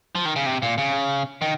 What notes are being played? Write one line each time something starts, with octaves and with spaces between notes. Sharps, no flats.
F3
D#3
C#3
C3
A#2
C#3
D#3